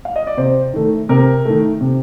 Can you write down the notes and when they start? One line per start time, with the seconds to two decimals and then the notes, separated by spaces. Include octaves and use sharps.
0.05 F5
0.16 D#5
0.27 D5
0.37 C3 C5
0.73 D#3 A3
1.09 C3 A#4
1.45 D#3 A3
1.81 C3